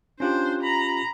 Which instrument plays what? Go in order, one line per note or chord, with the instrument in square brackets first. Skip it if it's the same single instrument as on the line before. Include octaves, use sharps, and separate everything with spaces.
[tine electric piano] C#4 F4 G4 [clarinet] D4 [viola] C5
[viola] A#5 [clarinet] B5